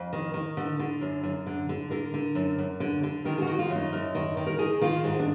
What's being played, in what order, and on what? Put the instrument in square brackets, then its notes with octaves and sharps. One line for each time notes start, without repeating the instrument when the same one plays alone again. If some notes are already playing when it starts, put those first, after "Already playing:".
Already playing: [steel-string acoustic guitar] F2
D#3
D#3
D3
D3
F#2
F#2
D3
D3
D3 A#4
D3
F#2
F#2
D3
D3
D#3 A#4
G#4
F#4
D#3
F4
F#2
D#4
F#2
D#3
D#3
A#4
D#3 G#4
D#3 F4
G#2 G#4
D4